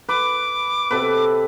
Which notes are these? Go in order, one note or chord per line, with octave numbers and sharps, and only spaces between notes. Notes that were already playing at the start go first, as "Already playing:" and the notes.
B4 D6
C3 A4 B4